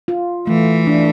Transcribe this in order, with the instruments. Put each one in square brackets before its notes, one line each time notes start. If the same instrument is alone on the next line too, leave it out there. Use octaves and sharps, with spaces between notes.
[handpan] F4
[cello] E3 [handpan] A3
[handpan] D4